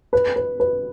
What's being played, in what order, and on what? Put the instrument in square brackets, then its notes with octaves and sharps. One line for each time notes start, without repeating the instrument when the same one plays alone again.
[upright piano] B4
B4
B4